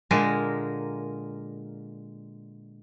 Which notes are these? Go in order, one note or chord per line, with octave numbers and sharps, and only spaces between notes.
A#2 D3 G#3 A#3 A#4